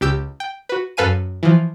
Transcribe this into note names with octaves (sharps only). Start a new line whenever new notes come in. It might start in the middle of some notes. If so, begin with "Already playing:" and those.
C#2 G4 E6 G6
G5
F#4 B4
F#2 A4 B4 F5 G#5 D#7
E3 F3